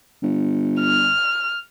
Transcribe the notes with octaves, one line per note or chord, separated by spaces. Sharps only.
G1
F6